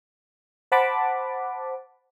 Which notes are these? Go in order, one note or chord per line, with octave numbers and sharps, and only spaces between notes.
C5 F#5 A5 B5 D6